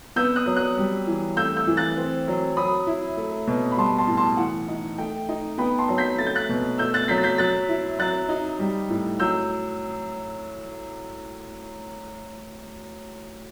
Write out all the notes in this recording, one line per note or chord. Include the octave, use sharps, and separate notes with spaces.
B3 E6 G6
D#6 F#6
F#3
D#6 F#6
G3
E3
A3 E6 G6
E6 G6
E3
F#6 A6
C4
F#3
F#3 B5 D#6
E4
A3
B2
B5
G3 A5 C6
A5 C6
A2
A5 C6
E3 F#5
D#4
A3 G5
D#4
B3 G5 B5
A5 C6
F#3
G6 B6
A3 A6
G6
F#6 A6
B2
A3 E6 G6
F#6 A6
F#3 G6 B6
A6
G6 B6
F#3 F#6 A6
E4
F#3 F#6 A6
D#4
G3
A2
F#3 E6 G6